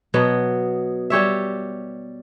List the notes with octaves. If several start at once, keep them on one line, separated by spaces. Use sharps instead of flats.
B2 F#3 B3
G3 G4 C#5 E5